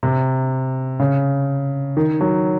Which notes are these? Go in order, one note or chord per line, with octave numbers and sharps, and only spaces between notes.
C3
C#3
D#3
F#3